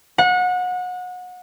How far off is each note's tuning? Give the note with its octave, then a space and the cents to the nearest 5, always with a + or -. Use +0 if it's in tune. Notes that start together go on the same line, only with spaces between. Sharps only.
F#5 -30